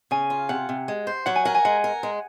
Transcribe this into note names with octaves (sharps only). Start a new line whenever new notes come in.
C#3 G#5
F4
C3 F#5
C3
G#3
C5
F#3 F#5
G#5
A#4 F#5
G#5
G#3 F#5
A#4
G#3